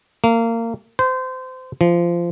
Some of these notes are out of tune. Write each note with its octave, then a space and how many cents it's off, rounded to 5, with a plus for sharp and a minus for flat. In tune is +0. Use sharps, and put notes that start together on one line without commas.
A#3 -25
C5 -25
F3 -20